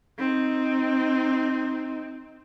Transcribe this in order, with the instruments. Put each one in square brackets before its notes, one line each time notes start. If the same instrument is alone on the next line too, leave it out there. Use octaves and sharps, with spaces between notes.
[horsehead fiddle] C4 D#4